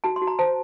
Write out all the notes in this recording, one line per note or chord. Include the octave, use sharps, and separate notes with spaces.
F#4 A5
C6
F#4
A#5
C5 A5